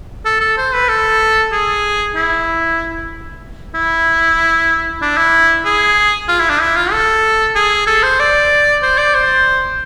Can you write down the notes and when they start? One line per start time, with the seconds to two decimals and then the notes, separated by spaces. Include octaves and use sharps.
0.25 A4
0.41 A4
0.58 C5
0.73 B4
0.89 A4
1.52 G#4
2.15 E4
3.75 E4
5.02 D4
5.17 E4
5.65 G#4
6.28 F4
6.40 E4
6.50 D4
6.61 E4
6.76 F4
6.92 A4
7.55 G#4
7.87 A4
8.03 C5
8.20 D5
8.83 C5
8.98 D5
9.14 C5